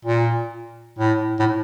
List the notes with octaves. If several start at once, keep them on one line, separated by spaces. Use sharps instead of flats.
A#2
A2
A2